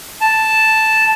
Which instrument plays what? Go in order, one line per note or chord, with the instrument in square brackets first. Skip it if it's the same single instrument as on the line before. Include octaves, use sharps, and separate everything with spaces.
[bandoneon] A5